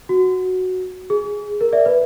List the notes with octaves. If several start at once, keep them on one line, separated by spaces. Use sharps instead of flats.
F#4
G#4
A#4
D5 E5
B4